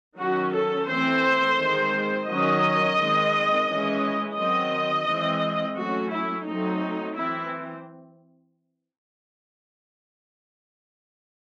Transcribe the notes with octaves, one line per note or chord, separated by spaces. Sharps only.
D#3 F#3 C#4 F#4
A4
E3 A3 C4 C5
D#3 G#3 C4
D#3 F#3 C#4 D#5
D#3 G#3 C4
E3 G#3 C#4
D#3 F#3 C4 D#5
E3 G#3 C4
F#3 A3 C#4 F#4
E4
F#3 A3 C4 D#4
E3 C4 E4